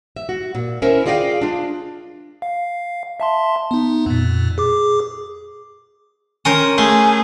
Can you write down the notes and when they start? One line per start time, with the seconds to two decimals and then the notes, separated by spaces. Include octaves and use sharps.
0.16 E5
0.29 F#4
0.55 A#2
0.82 C#4 E4 A#4 C5 E5
1.06 F4 G#4 D5 D#5 F5 G5
1.41 D4 F4
2.42 F5
3.20 E5 A5 C6
3.71 B3 D#4
4.06 F2 A#2
4.58 G#4 D6
6.45 C#4 A#4 C5 D#6
6.78 A3 G#4 C6